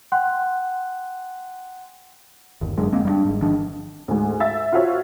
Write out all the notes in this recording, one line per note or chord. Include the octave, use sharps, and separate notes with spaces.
F#5 G5 C6 F#6
G1 D#2
F#2 D3 G#3
G#3 A#3 C4
G3 B3 D4
G#1 G#2
D#3 F3 D4
D2 G#2
E5 A6
F4 F#4 C5 C#5 E5 F5